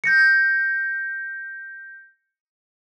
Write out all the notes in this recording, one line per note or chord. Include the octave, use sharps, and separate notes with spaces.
G6 A#6 C#7